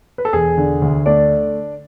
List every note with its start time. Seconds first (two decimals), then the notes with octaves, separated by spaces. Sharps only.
0.18 B4
0.25 A4
0.33 E1 G#4
0.58 D3
0.82 D2
1.06 A3 D4 D5